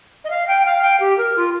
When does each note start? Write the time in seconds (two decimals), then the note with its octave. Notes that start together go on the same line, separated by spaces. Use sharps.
0.24 D#5
0.30 F5
0.48 G5
0.66 F5
0.82 G5
1.00 G4
1.18 A#4
1.37 F4